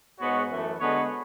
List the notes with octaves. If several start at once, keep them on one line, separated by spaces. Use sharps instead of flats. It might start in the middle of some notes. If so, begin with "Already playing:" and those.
G#2 G#3 B3 F#4 C#5
F#2 E3 A3
D3 G#3 B3 F#4 C#5